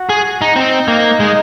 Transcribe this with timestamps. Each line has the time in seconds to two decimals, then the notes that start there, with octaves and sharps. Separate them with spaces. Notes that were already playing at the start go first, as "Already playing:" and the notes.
Already playing: F#4
0.10 G#4
0.41 D#4
0.56 C4 D#4
0.88 A#3
1.20 G#3